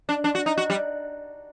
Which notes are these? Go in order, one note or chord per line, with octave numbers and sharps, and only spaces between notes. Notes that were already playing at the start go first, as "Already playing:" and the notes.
D4
D4
F#4
D#4
F#4
G3